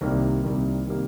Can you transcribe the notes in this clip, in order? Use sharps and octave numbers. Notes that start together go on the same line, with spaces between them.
C2 C3 D#3 G3 A#3
C2 C3 D#3 G3 A#3
C3 D#3 G3 A#3